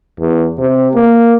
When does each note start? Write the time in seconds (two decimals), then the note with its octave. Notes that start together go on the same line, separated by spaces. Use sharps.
0.20 E2
0.59 C3
0.95 A#3